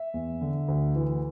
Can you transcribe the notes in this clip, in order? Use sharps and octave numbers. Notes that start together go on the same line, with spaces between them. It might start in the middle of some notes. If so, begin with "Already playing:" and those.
Already playing: E5
E2
D3
D2
E3